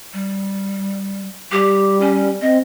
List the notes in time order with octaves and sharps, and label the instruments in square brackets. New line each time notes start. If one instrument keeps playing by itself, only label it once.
[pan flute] G3
[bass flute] G3 [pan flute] G4
[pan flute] C#4
[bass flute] C4 [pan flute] D#5